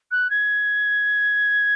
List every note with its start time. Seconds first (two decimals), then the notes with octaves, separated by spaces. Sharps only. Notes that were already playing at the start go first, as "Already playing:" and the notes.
0.11 F#6
0.30 G#6